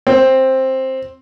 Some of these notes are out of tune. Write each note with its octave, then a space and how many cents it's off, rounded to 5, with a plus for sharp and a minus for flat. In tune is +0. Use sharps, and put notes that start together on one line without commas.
C4 +10